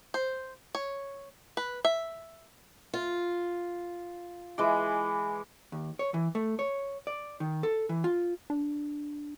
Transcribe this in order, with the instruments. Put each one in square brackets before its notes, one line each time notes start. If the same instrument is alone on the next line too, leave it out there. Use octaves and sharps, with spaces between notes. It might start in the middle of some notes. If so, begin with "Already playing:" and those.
[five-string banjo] C5
C#5
B4
E5
[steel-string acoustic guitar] F4
[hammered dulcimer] E3 G#3 D6
[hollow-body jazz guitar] D#2
C#5
E3
A3
C#5
D5
D#3
A4
E3
F4
[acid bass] D4